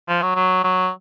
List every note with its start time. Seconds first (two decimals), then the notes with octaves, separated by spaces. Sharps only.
0.09 F3
0.22 F#3
0.36 F#3
0.64 F#3